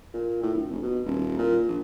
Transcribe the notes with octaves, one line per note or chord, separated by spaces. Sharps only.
A#2
A2
D1
F1
B2
D#1
A#2
A#1